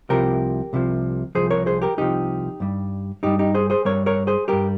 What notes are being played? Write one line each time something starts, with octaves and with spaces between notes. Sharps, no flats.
C2 C3 F3 G4 A#4
C2 C3 F3
C2 C3 F3 G#4 C5
A#4 C#5
G#4 C5
G4 A#4
C2 C3 F3 D#4 G4
G2 G3
G2 G3 D#4 G4
D#4 G4
G#4 C5
G#4 C5
G2 G3 A#4 C#5
A#4 C#5
G#4 C5
G2 G3 G4 A#4